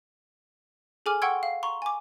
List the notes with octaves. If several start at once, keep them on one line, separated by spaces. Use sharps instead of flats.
G#4 A4 G#5 D6 F6
F#5 G5 C6 C#6 E6 G#6
F5
A#5 C6 C#6
G#5 D6